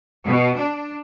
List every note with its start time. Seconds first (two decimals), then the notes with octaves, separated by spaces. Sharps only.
0.24 B2
0.54 D4